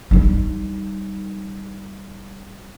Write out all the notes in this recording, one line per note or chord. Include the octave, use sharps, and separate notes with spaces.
G3 D#4